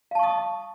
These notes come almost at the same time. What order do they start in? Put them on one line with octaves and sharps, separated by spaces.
F5 A5 C#6 D#6